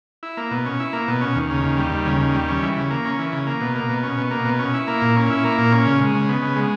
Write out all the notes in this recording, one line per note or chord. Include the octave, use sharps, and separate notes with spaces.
E4
A#3
B2
C#4
E4
A#3
B2
C#4
D#2
C#3
D#2
G3
D#2
C#3
D#2
G3
C#4
E3
C#3
A#3
C#4
E3
C#3
A#3
B2
A#3
B2
C#4
B2
A#3
B2
C#4
E4
A#3
A#2
C#4
E4
A#3
A#2
C#4
C#3
G#3
C#3
B3
C#3
G#3